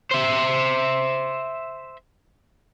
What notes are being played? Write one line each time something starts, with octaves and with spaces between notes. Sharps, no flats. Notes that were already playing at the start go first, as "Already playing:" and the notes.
C5 E5